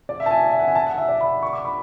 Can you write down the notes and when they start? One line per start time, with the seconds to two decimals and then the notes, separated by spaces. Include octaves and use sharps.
0.09 D5
0.20 E5
0.26 A5
0.31 G#5
0.52 E5
0.59 F#5
0.68 G#5
0.75 A5
0.87 F#5
0.98 E5
1.08 D5
1.21 B5
1.43 C#6
1.53 D6
1.65 B5